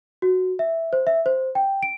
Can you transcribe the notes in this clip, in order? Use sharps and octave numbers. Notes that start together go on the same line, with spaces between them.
F#4
E5
C5
E5
C5
G5
D7